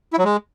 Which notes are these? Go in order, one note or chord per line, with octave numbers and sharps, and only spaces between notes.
E4
F#3
G#3